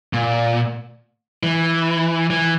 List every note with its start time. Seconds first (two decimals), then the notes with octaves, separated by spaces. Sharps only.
0.13 A#2
1.43 E3
2.30 E3